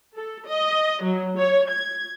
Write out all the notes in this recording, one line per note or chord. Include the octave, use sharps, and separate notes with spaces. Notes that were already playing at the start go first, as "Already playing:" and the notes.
A4
D#5
F#3
C#5
G#6